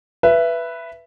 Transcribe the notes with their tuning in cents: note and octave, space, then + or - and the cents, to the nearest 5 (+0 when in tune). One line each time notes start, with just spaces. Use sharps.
B4 +0 E5 +20